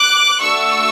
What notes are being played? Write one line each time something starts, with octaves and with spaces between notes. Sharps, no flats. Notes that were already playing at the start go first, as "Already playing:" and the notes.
Already playing: D6 F#6
A3 D4 F#4 A4 C#6 E6